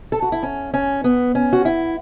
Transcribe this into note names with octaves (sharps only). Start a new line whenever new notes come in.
A4
F#4
E4
C#4
C#4
B3
C#4
F#4
E4